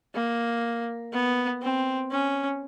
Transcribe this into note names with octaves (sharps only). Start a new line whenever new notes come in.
A#3
B3
C4
C#4